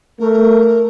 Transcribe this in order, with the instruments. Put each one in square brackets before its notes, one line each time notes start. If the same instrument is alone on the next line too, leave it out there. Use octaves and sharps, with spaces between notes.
[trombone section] A3 [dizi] A#4